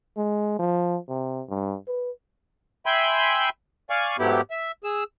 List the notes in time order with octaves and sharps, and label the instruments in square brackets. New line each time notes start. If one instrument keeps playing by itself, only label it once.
[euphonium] G#3
F3
C3
G2
B4
[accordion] E5 G5 G#5 B5 C6
D5 F5 G#5 C#6
G#2 F#3 A3 B3 E4 G4
E5
G#4 E6